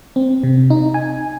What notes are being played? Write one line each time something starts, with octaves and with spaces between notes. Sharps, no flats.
C4
C3
D#4
G#5